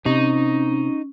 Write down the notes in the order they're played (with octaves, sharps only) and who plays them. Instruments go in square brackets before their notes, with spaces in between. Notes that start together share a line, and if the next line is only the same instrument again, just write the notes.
[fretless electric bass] C3 [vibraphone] C#4 [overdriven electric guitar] D#4